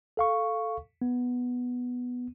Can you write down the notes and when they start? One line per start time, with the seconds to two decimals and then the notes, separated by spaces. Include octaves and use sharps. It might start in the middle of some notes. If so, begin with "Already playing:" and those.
0.17 A4 F5 C#6
1.02 B3